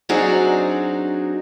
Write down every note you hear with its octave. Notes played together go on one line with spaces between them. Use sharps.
F#3 C4 D4 D#4 F#4 G#4